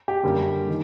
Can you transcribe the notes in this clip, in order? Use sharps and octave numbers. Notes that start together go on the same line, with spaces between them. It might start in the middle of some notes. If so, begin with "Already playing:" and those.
G4
F#2 D3 G3 A#3
D#3